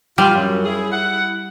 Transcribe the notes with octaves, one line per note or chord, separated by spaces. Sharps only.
G3 F4
F#2
E4 G#4
E4 F#5